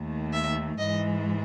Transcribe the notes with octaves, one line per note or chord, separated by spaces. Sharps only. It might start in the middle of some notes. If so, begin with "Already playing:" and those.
Already playing: D#2 D#3 A3
E5
G#2 E3 G#3 D#5